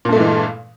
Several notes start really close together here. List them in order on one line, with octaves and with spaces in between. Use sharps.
A#2 G2 A3 G#3 E3